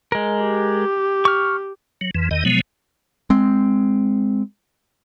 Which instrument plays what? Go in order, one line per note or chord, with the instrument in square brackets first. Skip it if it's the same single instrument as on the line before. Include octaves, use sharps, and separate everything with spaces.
[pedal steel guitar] G#3 A#4
[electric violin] G4
[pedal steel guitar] C#6 F6
[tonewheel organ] F#3
F2 E3
E2 D#3 D#5
B2 F3 F#3 G#3 B3
[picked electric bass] G#3 C4